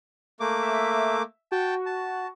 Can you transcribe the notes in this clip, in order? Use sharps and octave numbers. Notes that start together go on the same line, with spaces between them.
A3 A#3 D6
E5
F#4 G5 A5
A5